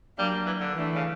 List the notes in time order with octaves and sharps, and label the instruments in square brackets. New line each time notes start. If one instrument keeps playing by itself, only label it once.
[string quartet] F#3 A#3 D4 [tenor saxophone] G3
[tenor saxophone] E3
D3
[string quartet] E3 A3 D4
[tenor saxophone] C#3